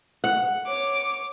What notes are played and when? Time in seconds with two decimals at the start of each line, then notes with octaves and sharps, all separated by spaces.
0.24 F#5
0.65 C#5 D6